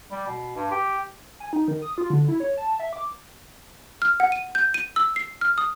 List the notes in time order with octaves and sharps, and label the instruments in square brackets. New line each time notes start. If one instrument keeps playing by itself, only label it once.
[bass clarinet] G3
B2
G2
G4
[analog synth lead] G#5
D#4
D#3
D#6
F4
D3
E4
C#5
A5
E5
D6
[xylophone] F6
F#5
D#7
G6
D#7
E6
C7
F6
D#6